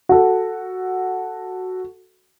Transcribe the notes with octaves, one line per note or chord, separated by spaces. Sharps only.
F#4 A4